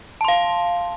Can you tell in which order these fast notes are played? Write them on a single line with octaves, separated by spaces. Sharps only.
A5 C6 F5